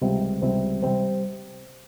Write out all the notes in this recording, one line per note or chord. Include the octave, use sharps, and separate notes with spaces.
C#2 C3 G3 C4
C#2 C3 G3 C4
C3 G3 C4